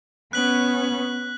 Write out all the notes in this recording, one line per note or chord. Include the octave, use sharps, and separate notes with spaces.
B3 C#4 F#6 B6 F#7